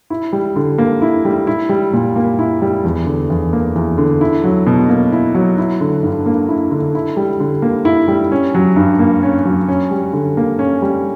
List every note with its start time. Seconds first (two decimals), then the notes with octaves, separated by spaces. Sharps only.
0.10 E4
0.33 G3
0.56 D3
0.78 A#3
1.02 E4
1.25 G3
1.47 E4
1.69 G3
1.93 A#2
2.16 A#3
2.39 E4
2.62 G3
2.84 E2
3.06 D3
3.30 E2
3.53 A#3
3.76 E2
3.98 D3
4.21 E4
4.44 F#3
4.67 B2
4.89 A#3
5.12 E4
5.34 F#3
5.58 E4
5.81 D3
6.03 G2
6.26 A#3
6.49 E4
6.71 D3
6.95 E4
7.17 G3
7.40 D3
7.62 A#3
7.85 E4
8.08 G3
8.32 C#4
8.54 F#3
8.76 G2
8.99 A#3
9.23 C#4
9.45 F#3
9.68 C#4
9.91 G3
10.13 D3
10.37 A#3
10.59 C#4
10.82 G3